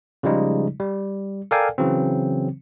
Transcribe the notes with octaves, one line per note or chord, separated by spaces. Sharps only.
C#3 F3 G3 G#3 D#4
G3
A4 A#4 D5 F5 G5 G#5
C#3 E3 F#3 C4